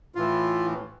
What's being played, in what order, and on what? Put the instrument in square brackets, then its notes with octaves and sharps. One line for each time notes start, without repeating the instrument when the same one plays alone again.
[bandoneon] A2 E3 F4